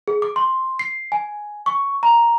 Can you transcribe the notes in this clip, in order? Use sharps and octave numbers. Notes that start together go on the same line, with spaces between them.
G#4
D6
C6
C7
G#5
C#6
A#5